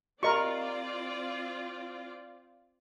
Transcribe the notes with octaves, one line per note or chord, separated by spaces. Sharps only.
C4 F4 G4 A#4 D5 D#5 B5 C#6